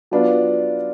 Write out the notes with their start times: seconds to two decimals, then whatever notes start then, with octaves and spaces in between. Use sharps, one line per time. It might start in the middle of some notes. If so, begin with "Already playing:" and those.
0.11 F#3 B3 D4 F4